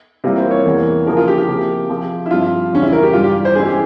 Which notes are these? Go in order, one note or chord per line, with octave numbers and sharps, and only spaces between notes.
C3 E3 G3 A#3 F4 A#4
C5
C#5
E2 E3 A#3
C#3 F3 A#3 E4 G#4 A#4
F4
G4
G4
C3 F3 A#3
F3 C4 F4 G#4
E4
G2 F3 C4 F4
E2 C#3 G3 C#4
E4
A#4
G4
G2 E3 G3 F4
G4
C5
E3 G#3 C#4 E4 G#4
G4